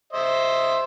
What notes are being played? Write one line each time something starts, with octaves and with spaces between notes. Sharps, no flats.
C5 D#5 E5